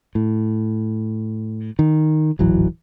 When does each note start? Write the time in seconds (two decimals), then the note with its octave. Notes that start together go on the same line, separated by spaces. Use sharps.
0.15 A2
1.79 D#3
2.39 D1 G#1 E3 F#3